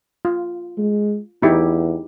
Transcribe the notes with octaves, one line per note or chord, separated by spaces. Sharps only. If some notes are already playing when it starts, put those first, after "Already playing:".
F4
G#3
E2 D#4 E4 G4